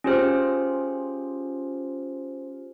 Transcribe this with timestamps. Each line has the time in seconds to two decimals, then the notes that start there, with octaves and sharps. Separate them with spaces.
0.04 C#4 F4 G4 G#4 C5 F6